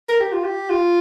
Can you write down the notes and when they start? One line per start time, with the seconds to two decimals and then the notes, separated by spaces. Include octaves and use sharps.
0.09 A#4
0.20 G4
0.32 F4
0.44 G4
0.70 F4